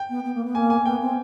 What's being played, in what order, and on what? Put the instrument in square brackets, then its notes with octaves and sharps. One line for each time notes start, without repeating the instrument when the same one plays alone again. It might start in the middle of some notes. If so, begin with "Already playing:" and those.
Already playing: [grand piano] G5
[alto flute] B3
B3
A#3
B3
[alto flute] A#3 [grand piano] G#5
[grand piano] G#5
[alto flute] B3 [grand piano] G5
[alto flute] C4